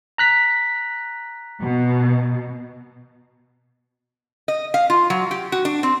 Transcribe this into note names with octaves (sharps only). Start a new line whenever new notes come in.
A#5 F#6 B6
B2
D#5
F5
F4
F#3
G4
F#4
D4
C4